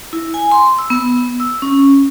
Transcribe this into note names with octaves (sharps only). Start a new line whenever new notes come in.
E4
G#5
C6
E6
B3
E6
C#4